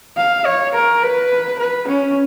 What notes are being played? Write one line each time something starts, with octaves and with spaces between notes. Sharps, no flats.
F5
C#5
A#4
B4
B4
C#4